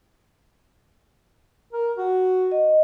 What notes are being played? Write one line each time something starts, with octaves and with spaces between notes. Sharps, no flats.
A#4
F#4
D#5